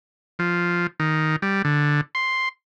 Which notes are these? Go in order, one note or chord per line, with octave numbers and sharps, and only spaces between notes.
F3
D#3
G3
D3
C6